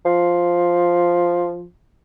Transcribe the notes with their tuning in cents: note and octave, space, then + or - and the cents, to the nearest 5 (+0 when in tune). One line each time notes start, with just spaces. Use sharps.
F3 +0